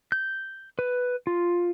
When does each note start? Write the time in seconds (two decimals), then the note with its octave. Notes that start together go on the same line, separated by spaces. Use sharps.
0.12 G6
0.79 B4
1.27 F4